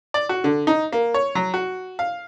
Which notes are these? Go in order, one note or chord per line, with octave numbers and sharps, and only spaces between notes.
D5
F#4
D3
D#4
A#3
C#5
F#3
F#4
F5